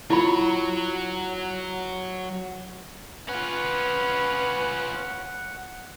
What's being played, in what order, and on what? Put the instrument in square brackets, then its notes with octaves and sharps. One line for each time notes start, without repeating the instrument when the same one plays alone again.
[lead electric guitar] F#3 C#5 [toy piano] E4 F4 B5
[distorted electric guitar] C#4 F4 [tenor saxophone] B4 [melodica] F#5